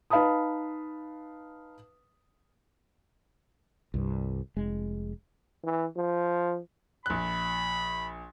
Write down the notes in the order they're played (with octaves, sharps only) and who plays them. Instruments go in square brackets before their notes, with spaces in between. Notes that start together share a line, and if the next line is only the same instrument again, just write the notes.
[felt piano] D#4 B4 F5 A5 B5 D#6
[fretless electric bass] C2 G2
F1 G#3
[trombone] E3
F3
[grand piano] A#1 F#6 [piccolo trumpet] B5